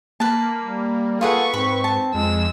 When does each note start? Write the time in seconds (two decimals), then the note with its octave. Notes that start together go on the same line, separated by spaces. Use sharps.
0.20 A#3 B4 A5
0.61 G3
1.21 F4 G#4 A4 B4 F#5 C#6
1.54 G#2 C4 B5
1.84 A5
2.14 F2 G#3 E6